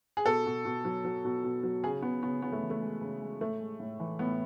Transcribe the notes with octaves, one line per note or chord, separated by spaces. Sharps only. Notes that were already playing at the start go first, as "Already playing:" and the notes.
G#4
B2 A4
B2
B2
F#3
F#3
B2
B2
F#3
C#3 G#4
C#3 B3
C#3 B3
C#3 B3
A3
E3
A3
G#3
C#3
G#3
A2 A3
G#3
A2
E3
A2 B3